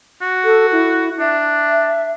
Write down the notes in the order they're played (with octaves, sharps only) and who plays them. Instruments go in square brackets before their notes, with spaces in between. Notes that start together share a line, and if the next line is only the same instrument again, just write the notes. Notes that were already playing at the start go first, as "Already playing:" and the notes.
[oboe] F#4
[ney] A4
E4
[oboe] D4 [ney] E5